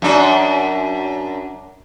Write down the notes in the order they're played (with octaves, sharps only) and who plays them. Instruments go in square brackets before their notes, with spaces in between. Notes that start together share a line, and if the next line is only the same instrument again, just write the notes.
[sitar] F#2 D4